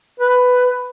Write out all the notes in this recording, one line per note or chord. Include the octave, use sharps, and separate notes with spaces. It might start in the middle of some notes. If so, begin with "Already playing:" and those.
B4